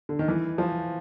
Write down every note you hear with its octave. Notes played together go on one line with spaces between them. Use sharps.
D3
D#3
E3
F3